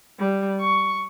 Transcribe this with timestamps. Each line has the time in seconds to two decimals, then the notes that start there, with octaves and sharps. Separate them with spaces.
0.19 G3
0.60 C#6